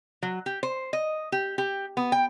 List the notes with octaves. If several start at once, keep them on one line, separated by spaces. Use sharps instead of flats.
F#3
G4
C5
D#5
G4
G4
B3
G5